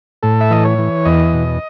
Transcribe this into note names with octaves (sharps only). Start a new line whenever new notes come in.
A2 A4
E5
E3 D#5
C#5
E3
E2 D#5
B2